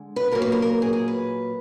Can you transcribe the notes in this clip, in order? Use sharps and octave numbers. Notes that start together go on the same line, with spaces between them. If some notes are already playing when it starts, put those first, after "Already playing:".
Already playing: D3 G#3
B4
A#2 F#3 A#3 A#4
B4
A#4
A#4
G#4
G#4
B4